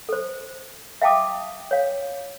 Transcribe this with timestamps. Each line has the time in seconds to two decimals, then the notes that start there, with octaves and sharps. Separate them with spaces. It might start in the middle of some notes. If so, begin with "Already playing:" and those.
0.09 A4 C5
1.02 E5 F5 G5 A5 D6 D#6
1.71 C#5 F5